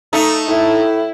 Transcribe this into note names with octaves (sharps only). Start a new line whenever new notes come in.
A3 D#4
A2 E4